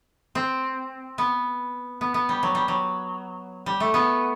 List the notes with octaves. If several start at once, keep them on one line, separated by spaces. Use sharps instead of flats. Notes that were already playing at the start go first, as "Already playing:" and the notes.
C4
B3
B3
B3
G3
F#3
G3
F#3
G3
A3
B3